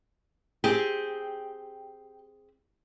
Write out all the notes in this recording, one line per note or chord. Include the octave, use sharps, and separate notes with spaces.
C4 G4 G#4